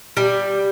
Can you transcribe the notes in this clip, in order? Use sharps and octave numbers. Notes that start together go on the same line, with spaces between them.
G3